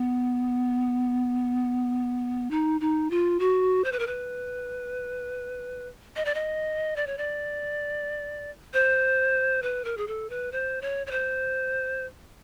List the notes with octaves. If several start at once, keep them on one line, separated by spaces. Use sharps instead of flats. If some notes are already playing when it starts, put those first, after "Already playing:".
Already playing: B3
D#4
D#4
F4
F#4
C5
B4
A#4
B4
D#5
D5
D#5
D5
C#5
D5
C5
B4
A#4
G#4
A4
B4
C5
C#5
C#5
C5